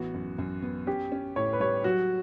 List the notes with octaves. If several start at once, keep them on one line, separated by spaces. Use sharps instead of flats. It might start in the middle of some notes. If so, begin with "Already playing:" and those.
Already playing: A1 B3 F#4
F#2
F#2
B3
C#4 G4
C#4
A2 C#5
B4
G3 C#5
F#3 F#4